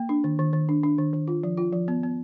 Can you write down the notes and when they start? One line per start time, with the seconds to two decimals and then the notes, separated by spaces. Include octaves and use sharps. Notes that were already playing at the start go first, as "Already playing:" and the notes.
Already playing: A#3
0.09 D4
0.24 D#3
0.39 D#3
0.53 D#3
0.69 D4
0.83 D4
0.98 D#3
1.14 D#3
1.28 F4
1.44 F3
1.57 F4
1.73 F3
1.88 B3
2.03 B3